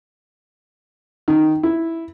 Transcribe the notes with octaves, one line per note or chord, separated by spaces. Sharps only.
D#3
E4